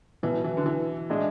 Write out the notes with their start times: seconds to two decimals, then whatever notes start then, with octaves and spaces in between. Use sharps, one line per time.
0.23 B2 E3 F#3 B3
0.44 E3
0.57 D3
0.66 E3
1.10 A2 G#3 D4